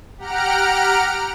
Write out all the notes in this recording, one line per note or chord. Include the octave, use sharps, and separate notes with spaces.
G4 F#5 A#5 F6 D7